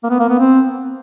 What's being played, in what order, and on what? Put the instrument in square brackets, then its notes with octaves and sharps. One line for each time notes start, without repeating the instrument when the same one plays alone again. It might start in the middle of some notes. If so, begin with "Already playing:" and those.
[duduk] A#3
B3
A#3
B3
C4